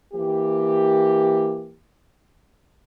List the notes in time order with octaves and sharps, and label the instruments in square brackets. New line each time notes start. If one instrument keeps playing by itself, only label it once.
[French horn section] E3 A#3 G4